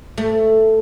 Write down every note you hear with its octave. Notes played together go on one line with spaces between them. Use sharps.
A3